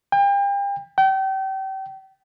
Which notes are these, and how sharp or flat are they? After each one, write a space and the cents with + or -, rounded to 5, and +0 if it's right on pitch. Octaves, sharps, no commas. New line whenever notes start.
G5 +35
G5 -35